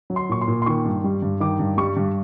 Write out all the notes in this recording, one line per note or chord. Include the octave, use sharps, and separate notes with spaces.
F#3
C6
A#2 C#6
C6
A#2
C6
D#3 C#6
G2
G3
G2
D#3 D6
G2
G3 C#6
G2